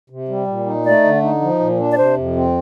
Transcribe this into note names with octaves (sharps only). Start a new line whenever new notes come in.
C3
G3
A#2
D#4
A3 D5
D3
D#4
F3
A#2
D4
D5
C3 C5
F2
C4